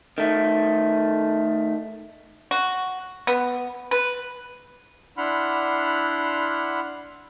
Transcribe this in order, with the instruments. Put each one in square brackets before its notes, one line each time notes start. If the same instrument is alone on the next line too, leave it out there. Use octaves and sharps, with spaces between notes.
[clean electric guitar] D#3 A3
[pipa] F#4
B3
B4
[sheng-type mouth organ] D4 E4 F#5 B5 C6 F6